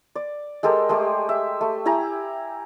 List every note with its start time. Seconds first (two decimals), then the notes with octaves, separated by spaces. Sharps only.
0.15 D5
0.63 G#3 G4 A4 A#4
0.89 G#3 A3 G4
1.29 E5
1.61 A3
1.86 E4 G4 G#5 A#5